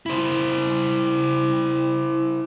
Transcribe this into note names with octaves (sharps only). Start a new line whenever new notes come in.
E4 C5